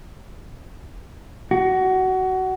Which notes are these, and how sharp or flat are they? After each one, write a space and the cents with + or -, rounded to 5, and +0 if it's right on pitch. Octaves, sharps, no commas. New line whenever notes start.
F#4 +20